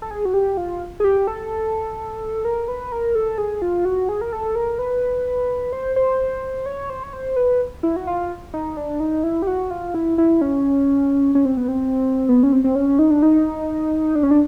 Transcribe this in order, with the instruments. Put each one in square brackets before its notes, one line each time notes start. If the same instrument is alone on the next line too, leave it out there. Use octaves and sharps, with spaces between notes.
[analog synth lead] A4
G#4
F#4
G4
F4
G#4
G4
A4
A#4
B4
A#4
A4
G#4
F4
F#4
G#4
A#4
A4
A#4
B4
C5
C5
C#5
C5
C#5
C5
B4
E4
F#4
F4
D#4
D4
D#4
E4
G4
F#4
F4
E4
E4
C#4
C#4
C4
B3
C4
B3
C#4
C4
C4
C#4
D#4
D4
D#4
D4
C#4
D4